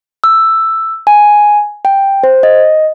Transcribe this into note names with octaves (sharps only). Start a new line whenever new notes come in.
E6
G#5
G5
C5
D#5